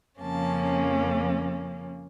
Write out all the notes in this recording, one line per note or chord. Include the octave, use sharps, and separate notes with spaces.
F2 C#3 F3 A#3 C#4 A5